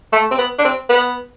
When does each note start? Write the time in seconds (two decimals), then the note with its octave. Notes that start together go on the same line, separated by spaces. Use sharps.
0.13 A3
0.31 C4
0.38 B3
0.59 D4
0.65 C4
0.90 B3